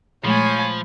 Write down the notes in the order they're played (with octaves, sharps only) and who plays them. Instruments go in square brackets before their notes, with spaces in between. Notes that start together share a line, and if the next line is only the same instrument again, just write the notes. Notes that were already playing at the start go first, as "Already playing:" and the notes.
[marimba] A#2 G#3 A3 [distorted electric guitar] F3 [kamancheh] C#5 G#5 [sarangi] B5